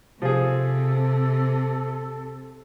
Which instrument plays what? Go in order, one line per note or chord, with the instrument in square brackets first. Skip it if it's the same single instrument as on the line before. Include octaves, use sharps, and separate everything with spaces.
[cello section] C3 [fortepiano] F3 G#4 [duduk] A4